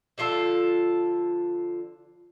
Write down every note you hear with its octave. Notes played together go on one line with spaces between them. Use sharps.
D3 F3 F4 A4